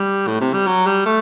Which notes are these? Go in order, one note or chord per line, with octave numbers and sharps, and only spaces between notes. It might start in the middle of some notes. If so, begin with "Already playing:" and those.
Already playing: G3
A2
C3
G3
F#3
G3
A3